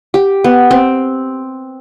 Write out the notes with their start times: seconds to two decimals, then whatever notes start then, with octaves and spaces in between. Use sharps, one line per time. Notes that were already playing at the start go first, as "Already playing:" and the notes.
0.14 G4
0.44 B3
0.71 C4